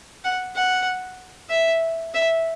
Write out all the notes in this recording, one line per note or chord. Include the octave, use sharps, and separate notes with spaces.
F#5
F#5
E5
E5